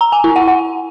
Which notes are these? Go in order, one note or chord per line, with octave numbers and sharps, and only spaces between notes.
A#5
G#5
E4
F#5
F#5